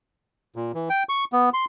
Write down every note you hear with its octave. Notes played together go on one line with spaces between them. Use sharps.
A#2
E3
G5
C#6
B3
C6